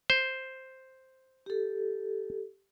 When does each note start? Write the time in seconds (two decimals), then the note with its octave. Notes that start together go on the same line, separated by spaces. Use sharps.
0.10 C5
1.46 G4 A4